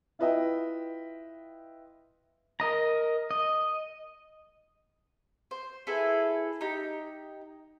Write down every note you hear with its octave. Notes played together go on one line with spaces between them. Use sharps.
E4 F4 B4 D#5 E5 G5
A#4 D#5 A#5
D#5
C5
E4 G#4 A4 B4
D#4 G4